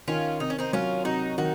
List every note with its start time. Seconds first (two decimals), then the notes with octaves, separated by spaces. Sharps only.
0.08 D#3 C#4 F4
0.40 C3 D#4
0.50 C#4
0.59 C4 D#4
0.73 F#3 C#4 F4
1.05 C3 D#4 F#4
1.38 D#3 D#4 F#4